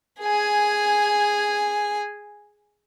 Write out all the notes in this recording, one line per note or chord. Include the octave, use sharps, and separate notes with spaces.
G#4 G#5